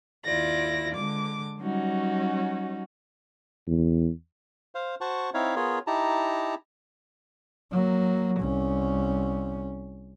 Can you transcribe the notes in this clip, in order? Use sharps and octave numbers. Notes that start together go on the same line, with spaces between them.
D#2 E4 F4 D5 A#6
D3 G#3 D6
F#3 G3 C#4 D#4 F#4
E2
C5 F5
F#4 C5 F#5 A5 C#6
C4 D#4 E4 C#5 E5 F5
B3 F4 G#4 A#4 C#5
D#4 E4 G4 A5 A#5
F#3 A#3
C2 C#4